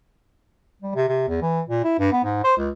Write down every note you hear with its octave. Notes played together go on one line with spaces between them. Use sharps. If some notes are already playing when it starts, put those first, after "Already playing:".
G3
C3
C3
E2
E3
A#2
E4
G2
B3
G#2
C5
C#2